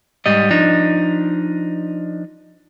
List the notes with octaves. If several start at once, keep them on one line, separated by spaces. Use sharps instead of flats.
G#2 G3 D#5
F3 D4 D#4